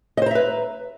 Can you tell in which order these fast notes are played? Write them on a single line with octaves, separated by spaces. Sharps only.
D#5 C5 A#5 E5 B4